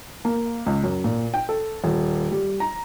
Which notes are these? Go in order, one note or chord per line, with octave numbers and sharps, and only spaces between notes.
A#3
C#2
F#2
A#2
G5
A4
D#1
G3
A#5